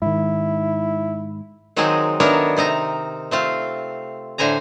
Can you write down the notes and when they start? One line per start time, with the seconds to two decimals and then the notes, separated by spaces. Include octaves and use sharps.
0.02 G#2 D#3 E4
1.76 D#3 F#3 G#3 C4 D#4 G#4
2.20 D#3 A3 B3 D4 A#4 C#5
2.57 C3 C4 D#4 A#5
3.31 A3 C4 F4
4.38 A2 D3 C5 G#5 A#5